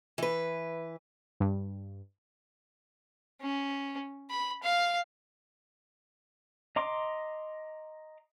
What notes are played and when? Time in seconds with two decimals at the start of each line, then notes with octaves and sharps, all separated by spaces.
0.18 E3 B4
1.40 G2
3.42 C#4
4.30 B5
4.63 F5
6.76 D#5 A#5 C6 D6